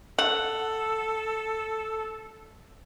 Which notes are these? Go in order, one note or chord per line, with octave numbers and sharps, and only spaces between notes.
A4 F#5